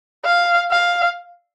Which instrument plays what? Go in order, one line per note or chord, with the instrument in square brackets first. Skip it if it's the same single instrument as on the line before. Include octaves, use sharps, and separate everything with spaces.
[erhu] F5
F5